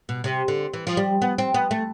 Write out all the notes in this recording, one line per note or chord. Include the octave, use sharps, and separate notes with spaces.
B2
C3
D3
E3
F3
G3
B3
C4
B3
A3